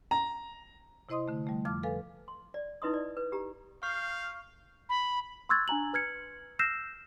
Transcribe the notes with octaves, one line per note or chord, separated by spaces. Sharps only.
A#5
C3 E4 C5 D#5 C6 D#6
D3 A3
G3 A3
F2 F3 D6 F6
A4 B4 F5 G#5
C6
D5
D#4 E4 B4 D#5 C6 D#6
D5
B4
G4 A#5
F5 C#6 F6 G6 C7
B5
C6 C#6 E6 F#6 G#6 A6
D4 G#5 A#5 F#7
B4 F6 G#6 C#7
E6 F6 G6 A#6 C7 E7